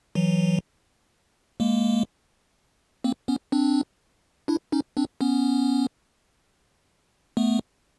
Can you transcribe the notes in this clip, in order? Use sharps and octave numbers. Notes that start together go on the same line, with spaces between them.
E3 F#3
G#3 A#3
A#3 C4
B3 C#4
C4 D4
D4 E4
C#4 D#4
C4 D4
B3 C#4
A3 B3